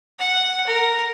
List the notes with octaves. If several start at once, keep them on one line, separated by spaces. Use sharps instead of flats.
F#5
A#4